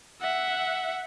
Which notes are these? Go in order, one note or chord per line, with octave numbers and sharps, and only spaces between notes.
E5 F#5